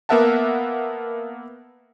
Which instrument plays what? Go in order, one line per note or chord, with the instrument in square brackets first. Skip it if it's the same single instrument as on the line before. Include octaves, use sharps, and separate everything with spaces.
[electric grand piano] A#3 B3 A#4 E5 F#5 A5